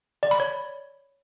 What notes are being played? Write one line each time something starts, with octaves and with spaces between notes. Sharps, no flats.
D5
B5
C#5